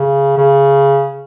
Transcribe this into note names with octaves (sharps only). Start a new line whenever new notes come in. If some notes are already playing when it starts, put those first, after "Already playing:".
Already playing: C#3
C#3